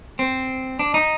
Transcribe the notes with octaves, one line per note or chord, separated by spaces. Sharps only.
C4
D4
D#4